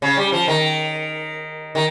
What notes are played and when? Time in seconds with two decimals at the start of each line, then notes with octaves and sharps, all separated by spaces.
0.02 C#3
0.17 G3
0.32 F3
0.48 D#3
1.75 D#3